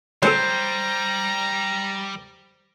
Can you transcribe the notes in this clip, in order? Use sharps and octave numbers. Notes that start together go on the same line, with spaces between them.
F#3 G3 C#4 A4 C5 A#5